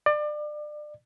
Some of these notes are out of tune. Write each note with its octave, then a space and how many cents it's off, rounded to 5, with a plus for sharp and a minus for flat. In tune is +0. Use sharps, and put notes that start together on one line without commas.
D5 +30